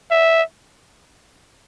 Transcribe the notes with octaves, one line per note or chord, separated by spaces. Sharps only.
E5